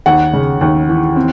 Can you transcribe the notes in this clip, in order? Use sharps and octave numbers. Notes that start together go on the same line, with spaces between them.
D#2 F#5
C#3
D#2
E3
C4